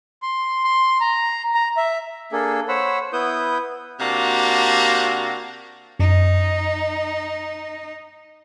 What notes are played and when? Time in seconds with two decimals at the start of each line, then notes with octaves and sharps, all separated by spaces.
0.22 C6
0.64 C6
1.01 A#5
1.54 A#5
1.77 E5
2.32 A#3 D4 G#4 A4
2.68 C5 C#5 F#5 B5 E6
3.13 B3 E4 B4 D#6 G6
4.00 C3 A#3 D4 F#4
5.99 F#2 D#4